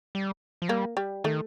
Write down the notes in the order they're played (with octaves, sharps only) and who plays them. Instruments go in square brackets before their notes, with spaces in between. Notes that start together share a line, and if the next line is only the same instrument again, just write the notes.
[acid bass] G3
F3
[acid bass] G3 [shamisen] A#3
[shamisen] G3
[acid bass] D#3 [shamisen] A3